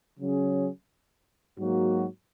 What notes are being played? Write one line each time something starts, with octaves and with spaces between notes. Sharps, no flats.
C#3 F#3 C#4 G#4
G#2 F#3 A#3 F#4